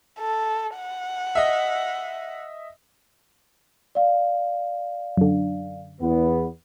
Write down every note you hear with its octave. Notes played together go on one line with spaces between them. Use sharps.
A4
F#5
D#5 E5
D5 F5
F#2 D3
E2 B3